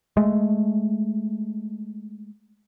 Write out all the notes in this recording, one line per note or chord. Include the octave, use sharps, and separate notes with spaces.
G#3 A3